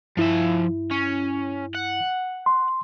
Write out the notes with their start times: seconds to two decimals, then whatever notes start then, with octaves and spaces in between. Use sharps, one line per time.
0.17 G2 F3 E4 E5
0.91 C#4
1.75 F#5
2.46 C6